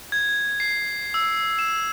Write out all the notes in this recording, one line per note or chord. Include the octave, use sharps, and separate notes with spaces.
G#6
C7
E6
E7